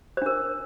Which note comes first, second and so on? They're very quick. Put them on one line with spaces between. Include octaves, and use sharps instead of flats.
C5 D4 A#4